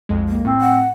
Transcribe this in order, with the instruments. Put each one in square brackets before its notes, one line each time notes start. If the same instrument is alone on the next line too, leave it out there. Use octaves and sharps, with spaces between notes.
[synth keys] B1 F2 G#3
[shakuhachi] A#3
[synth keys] A2 [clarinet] C4
[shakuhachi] F#5